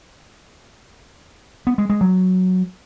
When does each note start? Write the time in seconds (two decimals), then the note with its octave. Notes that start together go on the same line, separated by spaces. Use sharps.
1.67 B3
1.78 G#3
1.90 G#3
2.01 F#3